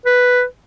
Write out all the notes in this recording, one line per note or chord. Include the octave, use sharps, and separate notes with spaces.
B4